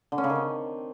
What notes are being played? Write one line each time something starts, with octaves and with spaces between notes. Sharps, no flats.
D3
C#4
C#3
D#3
C4